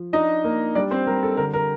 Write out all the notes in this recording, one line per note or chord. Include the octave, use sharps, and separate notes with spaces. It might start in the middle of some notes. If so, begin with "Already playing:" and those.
Already playing: F3
D4 D#4 D#5
A#3
G3 D4 D5
C4 C5
G3 A#4
A4
D3 A#4
A#4